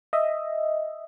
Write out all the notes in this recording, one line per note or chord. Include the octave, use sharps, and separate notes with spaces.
D#5 E5